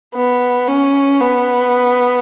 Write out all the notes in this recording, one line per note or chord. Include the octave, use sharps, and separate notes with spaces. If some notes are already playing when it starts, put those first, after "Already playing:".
B3
C#4
B3